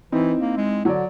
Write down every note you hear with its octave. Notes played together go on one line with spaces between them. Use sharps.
E3 C4 D#4 E4
A#3
G#3
D3 F#3 D5